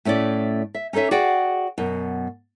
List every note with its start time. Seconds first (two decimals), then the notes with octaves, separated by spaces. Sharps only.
0.05 A2 A3 C#4 E4 D5
0.75 E5
0.93 C#4 D#4 A4 C#5 E5
1.11 F#4 G#4 D5 F#5 G5
1.78 F#2 B2